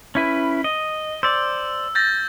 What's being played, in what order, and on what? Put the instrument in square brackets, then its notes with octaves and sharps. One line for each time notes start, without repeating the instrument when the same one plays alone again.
[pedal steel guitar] C#4 E4 B4
D#5
[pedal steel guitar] C5 D5 [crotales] E6
[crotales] G6 A6 A#6